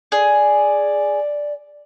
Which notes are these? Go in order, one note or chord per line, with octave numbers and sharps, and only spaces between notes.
G#4 D5